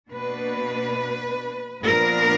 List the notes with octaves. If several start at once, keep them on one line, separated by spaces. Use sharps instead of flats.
B2 A#3 D4 B4
A#2 F3 B3 D4 A#4